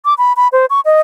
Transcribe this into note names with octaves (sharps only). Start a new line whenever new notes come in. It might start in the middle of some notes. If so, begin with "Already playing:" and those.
D6
B5
B5
C5
C#6
D#5